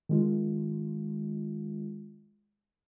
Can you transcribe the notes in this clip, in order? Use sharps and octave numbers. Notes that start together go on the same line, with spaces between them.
D#3 G#3 F4